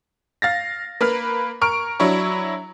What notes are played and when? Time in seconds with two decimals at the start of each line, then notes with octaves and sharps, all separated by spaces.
0.42 F5 A6 A#6
1.01 A#3 B4 B5 F6
1.61 A#4 C#6 F6 D7
2.00 F#3 D4 E4 C#5